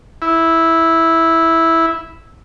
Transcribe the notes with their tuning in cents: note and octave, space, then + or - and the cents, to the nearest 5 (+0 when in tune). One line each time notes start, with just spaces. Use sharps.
E4 -5